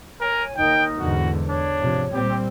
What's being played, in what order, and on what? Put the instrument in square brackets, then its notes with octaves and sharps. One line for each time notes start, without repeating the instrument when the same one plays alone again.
[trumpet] A#4 [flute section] C#5 G#5
[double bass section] D#2 [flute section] D#4 A#4 [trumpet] G5
[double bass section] E2 G#2 D3 [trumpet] F#4
[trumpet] D4 [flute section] C#5
[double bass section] G#2 C3 F3
[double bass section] A#2 G3 C4 [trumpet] G4